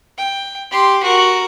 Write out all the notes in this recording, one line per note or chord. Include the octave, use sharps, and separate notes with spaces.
G5
G4 C6
F#4 A#4